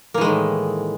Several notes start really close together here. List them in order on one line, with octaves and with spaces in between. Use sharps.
A#3 E3 G#3 D#3 A2